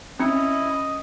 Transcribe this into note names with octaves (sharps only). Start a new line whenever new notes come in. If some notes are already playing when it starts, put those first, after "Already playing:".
C4 C#4 D#4 E4 D#5 C#7